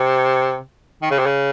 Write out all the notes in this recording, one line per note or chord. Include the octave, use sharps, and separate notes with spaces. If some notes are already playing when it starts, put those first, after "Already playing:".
Already playing: C3
D#3
C#3
C3
C#3